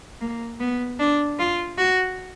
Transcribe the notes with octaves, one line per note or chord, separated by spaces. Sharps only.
A#3
B3
D4
F4
F#4